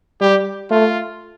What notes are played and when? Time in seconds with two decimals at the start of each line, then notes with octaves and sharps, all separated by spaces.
0.21 G3 G4
0.71 A3 F4